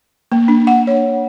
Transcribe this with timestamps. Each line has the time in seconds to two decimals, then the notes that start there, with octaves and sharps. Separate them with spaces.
0.32 A#3
0.48 D4
0.67 F#5
0.87 C#5